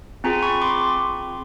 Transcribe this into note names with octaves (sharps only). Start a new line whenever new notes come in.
C4 F4 G#4 G#5 A#5
B5 C#6
C6 D6